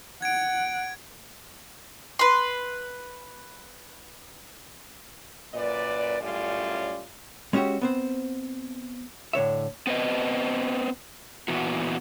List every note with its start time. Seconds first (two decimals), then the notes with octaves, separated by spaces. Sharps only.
0.22 F#5 G#6 D7
2.19 B4 C6
5.54 F#2 A#2 B4 D5
6.20 F#2 A2 G3 C#4 F4 D5
7.53 G#3 C#4 D#4 F#4 G4 E5
7.81 B3 C4 C5
9.33 A2 D3 C#5 E5
9.87 B3 C4 B4 D#5
11.48 A#2 E3 B3 F#4